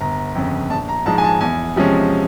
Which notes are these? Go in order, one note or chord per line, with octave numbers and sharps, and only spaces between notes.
G1 A#5
F2 C#3
A#1 A5
A#5
G#2 F3 G#3 A5
G#5
A5
E2 G#5
C3 F3 G#3 C#4